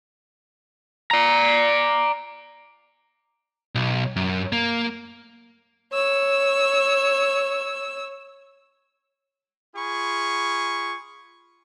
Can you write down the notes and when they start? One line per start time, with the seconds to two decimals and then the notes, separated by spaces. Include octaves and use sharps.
1.11 D5 A#5
3.75 B1
4.16 F#2
4.53 A#3
5.93 C#5 E6
9.76 F4 G#4 B5 C#6